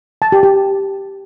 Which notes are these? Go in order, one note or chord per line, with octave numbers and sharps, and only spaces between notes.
A5
G4
G4